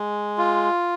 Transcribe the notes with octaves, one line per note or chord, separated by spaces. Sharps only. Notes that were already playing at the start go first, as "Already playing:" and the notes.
Already playing: G#3
F4